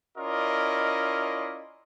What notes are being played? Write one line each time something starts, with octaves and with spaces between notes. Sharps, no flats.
C#4 E4 F4 A#4 D5 D#5